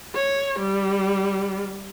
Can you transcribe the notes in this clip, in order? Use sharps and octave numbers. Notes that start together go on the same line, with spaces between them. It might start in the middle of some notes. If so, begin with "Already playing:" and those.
C#5
G3